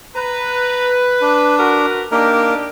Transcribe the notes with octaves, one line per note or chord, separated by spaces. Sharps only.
B4 A#5
D4
F#4 A#4 B4
A#3 D4 D#4 G4 A#4